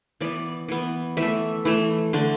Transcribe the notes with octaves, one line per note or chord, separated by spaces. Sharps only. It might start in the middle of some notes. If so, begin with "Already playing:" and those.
E3 B3 D5
E3 B3
E3 A3 E5
E3 A3
D3 A3